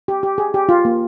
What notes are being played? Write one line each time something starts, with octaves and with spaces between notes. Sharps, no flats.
G4
G4
G#4
G4
F4
A#3